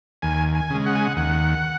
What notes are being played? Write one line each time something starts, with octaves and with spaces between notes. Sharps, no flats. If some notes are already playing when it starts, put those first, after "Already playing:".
D#2 G#5
G#5
C#3 G#3
F#5
G#5
F#5
D#2 F#5